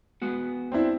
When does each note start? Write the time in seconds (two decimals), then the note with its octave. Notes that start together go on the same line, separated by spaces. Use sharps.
0.22 G#3 B3 F#4
0.72 C4 D4 E4